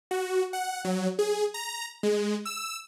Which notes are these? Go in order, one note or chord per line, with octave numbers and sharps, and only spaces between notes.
F#4
F#5
F#3
G#4
A#5
G#3
E6